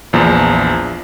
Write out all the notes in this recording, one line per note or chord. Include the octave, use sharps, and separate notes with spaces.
A#1 E2 F3